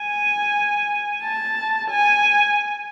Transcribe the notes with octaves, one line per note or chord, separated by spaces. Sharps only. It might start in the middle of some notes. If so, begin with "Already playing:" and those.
Already playing: G#5
A5
G#5